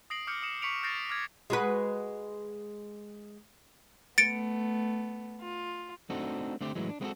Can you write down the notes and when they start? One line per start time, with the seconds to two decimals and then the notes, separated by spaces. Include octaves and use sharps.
0.10 D#6 A#6 C7 D7 F#7
0.27 D6 F6 G6 C#7
0.42 D#6 C#7 E7
0.62 C#6 B6 C#7 D7 F7 F#7
0.83 F6 G6 A6 A#6 C7 D7
1.10 D6 F6 G#6
1.50 G#3 F#4 B4
4.18 A3 B3 A6 C#7 D7
5.40 F4
6.10 A3 C4 D4 D#4 F#4 A4
6.61 D3 A3 C4 G4
6.75 A2 E3 F#3 G#3
6.89 D4
7.01 G#3 B3 C4 E4 F#4 A4